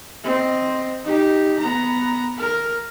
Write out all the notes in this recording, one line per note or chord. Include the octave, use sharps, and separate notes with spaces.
C4 D#5
D#4 G4
B3 A#5
A#4